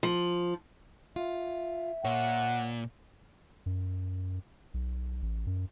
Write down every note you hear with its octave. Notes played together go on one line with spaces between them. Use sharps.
F3
F4 E5
A#2 C#5 F#5
F#2
B1
A1
F#2